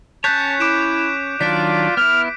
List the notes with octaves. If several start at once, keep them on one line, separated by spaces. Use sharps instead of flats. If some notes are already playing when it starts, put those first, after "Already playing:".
C#4 C#5 A5 F#6 G6 B6
E4 D6 D7 E7
D#3 F#3 D4 F4 D5 B6 D7
B3 E4 F6